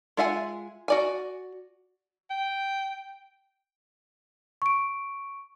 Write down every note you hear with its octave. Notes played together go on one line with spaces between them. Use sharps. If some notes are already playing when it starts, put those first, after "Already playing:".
G#3 F4 E5 F#5 G#5
F#4 D5 G#5
G5
C#6 D7